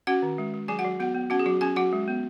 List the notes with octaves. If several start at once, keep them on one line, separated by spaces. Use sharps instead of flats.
C#4 F#4 F#5
D#3
G#3
G#3
F#3 G#4 G#5
F#4 F#5
F#3
B3 F#4 F#5
B3
C#4 F#4 F#5
G#4
F#3 F#4
C#4 G#4 G#5
F#3 F#4 F#5
G#3
B3